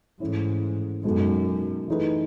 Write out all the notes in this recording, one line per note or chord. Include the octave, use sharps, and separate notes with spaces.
G#2 E3 A3 C#4 E4
F#2 B2 G#3 D#4 F#4 A4
E3 A3 D#4 G#4 B4